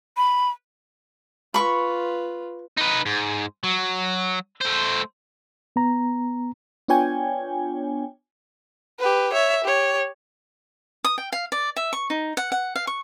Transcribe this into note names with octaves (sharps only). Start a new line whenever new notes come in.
B5
F4 B4 B5 C#6
D#4 B4
G#2
F#3
A3 C5
B3 A#5
B3 D4 F4 C#5 G5 G#5
G4 B4
C#5 E5
G4 C#5
D#6
G5
F5
D5
E5
C#6
D#4
F#5
F#5
F5
C#6